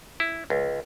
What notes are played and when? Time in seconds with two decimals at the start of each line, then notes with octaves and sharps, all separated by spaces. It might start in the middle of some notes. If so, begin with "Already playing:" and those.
0.20 E4
0.50 C#2